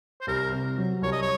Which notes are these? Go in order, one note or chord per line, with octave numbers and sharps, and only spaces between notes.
C5
C2 A#4
C3
F#3
C2 C#5
D#5
C#5